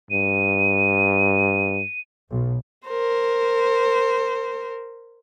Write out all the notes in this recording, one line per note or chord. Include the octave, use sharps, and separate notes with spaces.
G2 D#7
B1
A#4 C5